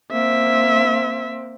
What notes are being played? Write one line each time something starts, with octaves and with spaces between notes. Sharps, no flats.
A#3 C4 E5